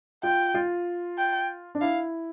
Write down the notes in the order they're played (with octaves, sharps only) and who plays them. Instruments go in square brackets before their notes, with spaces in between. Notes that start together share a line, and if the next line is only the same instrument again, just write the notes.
[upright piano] F4 [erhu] G5
[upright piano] F4
[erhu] G5
[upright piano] D4
[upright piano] E4 [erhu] F5